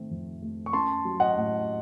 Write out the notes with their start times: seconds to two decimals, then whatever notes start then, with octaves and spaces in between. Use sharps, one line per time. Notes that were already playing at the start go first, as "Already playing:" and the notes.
Already playing: D#3 A3 C4
0.11 F2
0.42 A3
0.66 C#6
0.73 C#4 A5 C6
1.05 F#3
1.20 D#5 F#5
1.36 A2